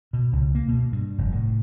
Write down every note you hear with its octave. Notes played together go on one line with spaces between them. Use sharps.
B2
C#2
A#3
B2
G2
F1
A2